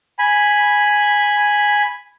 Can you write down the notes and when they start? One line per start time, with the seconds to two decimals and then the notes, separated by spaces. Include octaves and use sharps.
0.19 G#5 B5